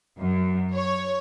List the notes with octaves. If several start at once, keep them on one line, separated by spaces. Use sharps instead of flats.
F#2
C#5